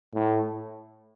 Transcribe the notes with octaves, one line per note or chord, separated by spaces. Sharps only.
A2